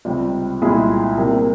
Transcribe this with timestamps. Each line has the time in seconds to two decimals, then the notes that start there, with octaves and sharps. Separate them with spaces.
0.05 C#2 C3 G3
0.61 C2 A#2 G#3 E4 G#4
1.17 C3 G3 A#3